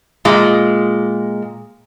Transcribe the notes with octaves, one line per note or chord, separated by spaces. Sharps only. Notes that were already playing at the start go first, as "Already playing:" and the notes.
A#2 G#3